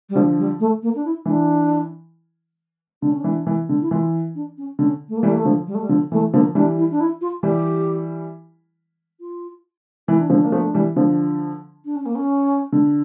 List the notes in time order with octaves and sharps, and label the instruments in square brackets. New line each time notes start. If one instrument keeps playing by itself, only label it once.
[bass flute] G3
[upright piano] D3 F3
[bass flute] G3
A3
A#3
D4
E4
[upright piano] E3 [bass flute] D4
[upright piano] D3 [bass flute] D4
[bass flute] C#4
[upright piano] E3 [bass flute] D4
[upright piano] E3
D3
[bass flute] E4
[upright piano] E3 [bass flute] F4
[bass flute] D4
C#4
[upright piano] D3 [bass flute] C#4
[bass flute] A3
A#3
[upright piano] E3 G3
[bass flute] A3
A#3
A3
[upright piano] D3 F3
[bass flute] G3
A3
G3
[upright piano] D3 [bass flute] F3
[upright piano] E3 [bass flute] A3
[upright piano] D3 F3 [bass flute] A#3
[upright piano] E3 G3 [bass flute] D4
[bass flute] E4
D4
E4
F4
[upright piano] E3 G3 [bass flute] G4
[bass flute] F4
[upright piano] E3 [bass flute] E4
[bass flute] D4
[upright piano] D3 F3 [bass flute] C#4
[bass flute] D4
[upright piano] A#3
F3 A3
E3 G3
D3 F3
[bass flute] D4
C#4
A#3
C#4
[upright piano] D3